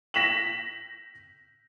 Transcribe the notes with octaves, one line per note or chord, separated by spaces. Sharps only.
A#6 B6 E7 F#7